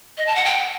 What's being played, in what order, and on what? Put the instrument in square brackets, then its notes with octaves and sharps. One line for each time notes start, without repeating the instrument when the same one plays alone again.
[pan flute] D#5
A5
F#5
G5